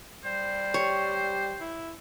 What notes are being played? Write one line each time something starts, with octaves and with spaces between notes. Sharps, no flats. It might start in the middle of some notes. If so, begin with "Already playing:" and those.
G3 C5
G4 C#5
E4